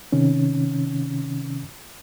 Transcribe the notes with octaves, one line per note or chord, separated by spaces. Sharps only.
C3 D#3 C#4